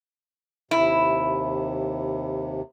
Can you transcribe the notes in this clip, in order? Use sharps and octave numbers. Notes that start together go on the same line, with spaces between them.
D#2 C3 E4